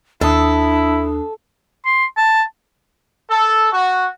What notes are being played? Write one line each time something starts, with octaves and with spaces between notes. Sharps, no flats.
D#2 D4 E4 A4 D#6
C6
A5
A4
F#4